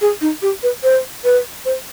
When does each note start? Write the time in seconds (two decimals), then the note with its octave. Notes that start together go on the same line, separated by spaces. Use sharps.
0.01 G#4
0.21 D#4
0.42 G4
0.63 B4
0.83 C5
1.24 B4
1.65 C5